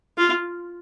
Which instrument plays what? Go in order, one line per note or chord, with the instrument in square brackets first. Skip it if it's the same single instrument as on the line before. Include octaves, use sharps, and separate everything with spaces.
[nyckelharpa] F4